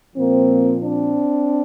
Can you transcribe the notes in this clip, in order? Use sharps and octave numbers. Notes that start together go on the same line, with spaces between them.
A#2 F3 A#3 C4
C4 D4